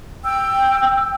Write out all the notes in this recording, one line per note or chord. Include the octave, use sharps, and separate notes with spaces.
G5 E6